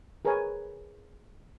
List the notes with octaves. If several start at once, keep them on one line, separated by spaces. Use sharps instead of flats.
G#4 A#4 B4 C#5 G#5